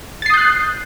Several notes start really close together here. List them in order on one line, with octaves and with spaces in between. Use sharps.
A6 C7 D#6 G6 F#6